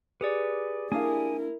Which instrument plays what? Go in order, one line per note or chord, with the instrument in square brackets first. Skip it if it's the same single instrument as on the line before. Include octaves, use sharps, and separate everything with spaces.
[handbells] G4 G#4 D5 [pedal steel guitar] B4
[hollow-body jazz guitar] A#3 D4 F5 [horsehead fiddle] E4 A#4 [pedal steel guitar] G#5 D#6